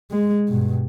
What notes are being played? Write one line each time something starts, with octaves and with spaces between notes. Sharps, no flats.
G#3
G2 B2